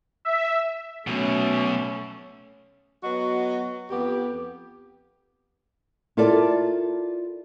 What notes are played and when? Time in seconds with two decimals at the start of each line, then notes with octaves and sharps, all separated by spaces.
0.25 E5
1.07 B2 F#3 A3 C#4
3.03 F#3 B3 F#4 D#5
3.90 F2 B3 G4
6.17 E4 F4 A4 A#4 D5